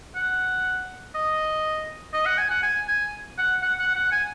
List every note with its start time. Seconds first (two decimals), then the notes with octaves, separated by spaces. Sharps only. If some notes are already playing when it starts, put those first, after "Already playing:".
0.16 F#5
1.15 D#5
2.14 D#5
2.26 F#5
2.38 G#5
2.50 F#5
2.63 G#5
2.88 G#5
3.38 F#5
3.62 F#5
3.79 F#5
3.96 F#5
4.12 G#5